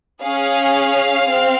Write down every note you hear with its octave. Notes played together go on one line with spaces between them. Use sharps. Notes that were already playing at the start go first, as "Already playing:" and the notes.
C#4 G#4 F5
C4